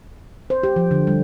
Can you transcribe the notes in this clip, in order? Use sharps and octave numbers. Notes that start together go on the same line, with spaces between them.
C5
G4
F3
D3
G3